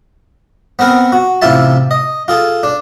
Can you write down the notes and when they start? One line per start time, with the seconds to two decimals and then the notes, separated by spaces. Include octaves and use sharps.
0.79 B3 C4 A#4 B4
1.12 F#4
1.42 A1 C3 E4 F4 E5 A5
1.91 D#5
2.28 F4 G#4 A4
2.63 D4